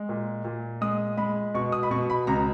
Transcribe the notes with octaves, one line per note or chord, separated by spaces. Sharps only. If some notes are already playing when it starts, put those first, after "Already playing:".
Already playing: G#3
A#2
A#2
G#3 D#6
G#3 B5
B2 C#6
D#6
B5
B2 C#6
B5
C#2 A#5